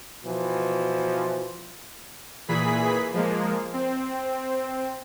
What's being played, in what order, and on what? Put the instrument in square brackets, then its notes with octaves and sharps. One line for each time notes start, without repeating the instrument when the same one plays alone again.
[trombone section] B2 E3 F3
[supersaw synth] A#2 E3 G#4 B5 B6
F3 G#3 A#3
C4